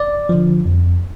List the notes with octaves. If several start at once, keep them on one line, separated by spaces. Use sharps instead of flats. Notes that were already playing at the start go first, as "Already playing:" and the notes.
Already playing: D5
D3 F3
F2